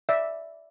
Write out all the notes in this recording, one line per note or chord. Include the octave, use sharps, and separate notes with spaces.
D5 E5